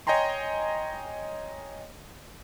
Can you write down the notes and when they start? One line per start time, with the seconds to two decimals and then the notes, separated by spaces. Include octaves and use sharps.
0.07 C#5 D#5 G5 G#5 A#5 C6